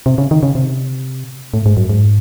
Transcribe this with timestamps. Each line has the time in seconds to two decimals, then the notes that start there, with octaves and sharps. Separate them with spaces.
0.06 C3
0.18 C#3
0.31 D#3
0.43 C#3
0.55 C3
1.54 A2
1.66 G#2
1.77 F#2
1.89 G#2